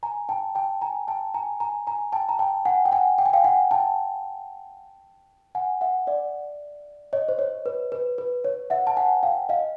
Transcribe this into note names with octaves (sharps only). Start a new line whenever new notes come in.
G#5 A#5
G5 A5
G5 A5
G#5 A#5
G5 A5
G#5 A#5
G#5 A#5
G#5 A#5
G5 A5
A#5
G5 A5
F#5 G#5
G5
F#5 G#5
G5
G#5
F5 G5
F#5 G#5
G5 A5
F#5 G#5
E5 F#5
D5 E5
C#5 D#5
C5
C#5
B4
B4
B4
C#5
E5 F#5
A5
F#5 G#5
F5 G5
D#5 F5